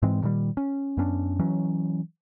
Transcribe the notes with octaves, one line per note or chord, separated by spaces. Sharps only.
G#2 E3 G#3 C4
D2 A#2 D#3 G3
C#4
F#2 B3 C#4 D4
E3 F#3 C#4